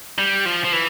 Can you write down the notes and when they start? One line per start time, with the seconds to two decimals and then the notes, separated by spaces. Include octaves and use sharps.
0.18 G3
0.45 F3
0.64 F3
0.72 E3